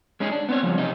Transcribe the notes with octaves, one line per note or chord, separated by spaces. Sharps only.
G#3 C#4 D#4 G#4
D4
B3 C4 C#5
C#3 F3 G3 C#4
C3 C#4 D#4 D#5